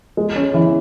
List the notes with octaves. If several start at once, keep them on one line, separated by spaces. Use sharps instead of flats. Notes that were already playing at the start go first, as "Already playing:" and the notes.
G#3
C#4
E3